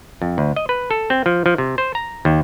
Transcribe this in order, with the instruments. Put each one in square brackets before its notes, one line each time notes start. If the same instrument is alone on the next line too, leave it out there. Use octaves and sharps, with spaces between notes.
[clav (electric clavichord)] F2
D2
D#5
B4
A4
C4
F3
F3
C3
C5
A#5
D#2